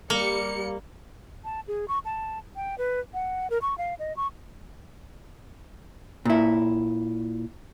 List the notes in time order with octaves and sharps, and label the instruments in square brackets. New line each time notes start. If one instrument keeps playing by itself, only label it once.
[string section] G3 C#7 [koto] A#3
[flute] A5
G#4
C#6
A5
G5
B4
F#5
A#4
C#6
F5
D#5
C#6
[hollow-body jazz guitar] A#2 E4